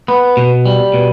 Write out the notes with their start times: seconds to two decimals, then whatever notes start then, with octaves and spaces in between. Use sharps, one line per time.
0.08 B3
0.37 B2
0.66 G3
0.94 B2